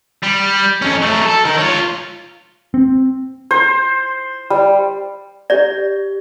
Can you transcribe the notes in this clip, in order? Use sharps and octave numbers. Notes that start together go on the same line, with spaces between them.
G3
F2 C#4
F#3 A3
A4
D#4 A#4
F4 C#5
C4
C5
G3
G4 D5 G6 A#6